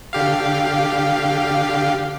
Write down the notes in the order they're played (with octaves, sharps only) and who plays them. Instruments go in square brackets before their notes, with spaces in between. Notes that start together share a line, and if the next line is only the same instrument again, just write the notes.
[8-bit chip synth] D3 G4 F5